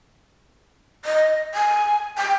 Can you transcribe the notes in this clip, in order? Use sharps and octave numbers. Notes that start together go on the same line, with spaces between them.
D#5
G#5
G5